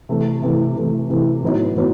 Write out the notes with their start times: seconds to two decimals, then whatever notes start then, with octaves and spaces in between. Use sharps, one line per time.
0.09 C3 E3 A3
0.42 C3 E3 A3
0.76 C3 E3 A3
1.09 C3 E3 A3
1.42 A2 F#3 B3 D#4
1.76 A2 F#3 B3